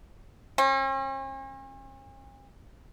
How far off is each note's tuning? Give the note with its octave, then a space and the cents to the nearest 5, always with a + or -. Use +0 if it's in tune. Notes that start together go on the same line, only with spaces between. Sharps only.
C#4 -45